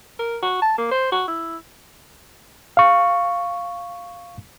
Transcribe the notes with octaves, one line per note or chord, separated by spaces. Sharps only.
A#4
F#4
A5
A#3
C5
F#4
E4
F5 C#6